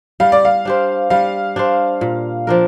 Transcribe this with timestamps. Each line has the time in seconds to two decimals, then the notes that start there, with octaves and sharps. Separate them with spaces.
0.20 G3 F5
0.32 D5
0.45 F5
0.65 D4 G4 C5
1.10 G3 F5
1.56 D4 G4 C5
2.01 A#2
2.47 F3 D4 A#4